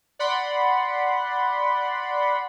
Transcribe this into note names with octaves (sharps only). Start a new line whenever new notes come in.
D5 F#5 B5 C6